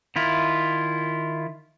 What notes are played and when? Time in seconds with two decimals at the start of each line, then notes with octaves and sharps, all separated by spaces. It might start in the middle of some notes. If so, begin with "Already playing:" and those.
0.16 D#3 E4 F4